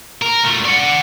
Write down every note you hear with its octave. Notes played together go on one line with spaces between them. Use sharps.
A#4
A#2 A3
D5 F#5